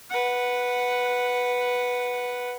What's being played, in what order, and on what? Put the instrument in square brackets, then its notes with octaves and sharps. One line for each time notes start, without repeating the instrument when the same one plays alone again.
[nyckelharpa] B4 F#5